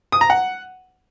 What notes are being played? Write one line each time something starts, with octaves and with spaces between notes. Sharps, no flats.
D#6
A#5
F#5